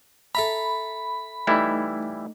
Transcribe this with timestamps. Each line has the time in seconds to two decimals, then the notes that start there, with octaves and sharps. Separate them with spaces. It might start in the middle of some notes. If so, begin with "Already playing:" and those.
0.35 A4 E5 A#5 B5
1.47 E3 G3 A3 D#4 E4